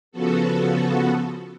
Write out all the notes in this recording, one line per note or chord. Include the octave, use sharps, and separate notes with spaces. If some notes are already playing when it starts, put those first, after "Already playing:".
C#3 F3 B3 F#4 A4